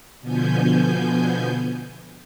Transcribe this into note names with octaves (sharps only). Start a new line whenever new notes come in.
B2 D3 F3 B3 G#5 G6